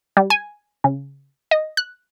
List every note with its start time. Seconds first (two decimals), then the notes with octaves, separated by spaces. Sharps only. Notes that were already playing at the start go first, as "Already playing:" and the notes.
0.17 G3
0.30 G#5
0.84 C#3
1.51 D#5
1.77 F#6